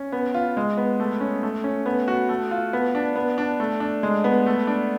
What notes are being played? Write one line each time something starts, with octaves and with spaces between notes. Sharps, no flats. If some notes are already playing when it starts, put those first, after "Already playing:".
Already playing: C#4
B3
F4
G#3
B3
A3
C#4
A3
C#4
B3
F#4
A3
F4
B3
D4
B3
D4
A3
D4
G#3
B3
A3
D4